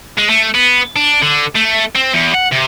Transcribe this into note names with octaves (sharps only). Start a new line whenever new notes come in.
G#3
A3
B3
D4
D3
A3
C4
E2
F#5
C3